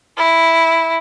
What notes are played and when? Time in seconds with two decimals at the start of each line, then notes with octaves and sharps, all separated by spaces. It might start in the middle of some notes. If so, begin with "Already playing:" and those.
0.17 E4